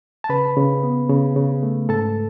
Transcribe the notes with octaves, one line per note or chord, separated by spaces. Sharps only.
A5
C#3 B4 B5
C#3
B3
C#3
C#3
A3
G#2 A4 A5